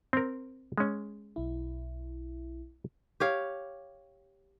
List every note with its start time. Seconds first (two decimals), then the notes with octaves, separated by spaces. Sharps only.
0.13 C4 A#4
0.78 G#3 C#4
1.36 B1 E4
3.20 G4 C#5 F5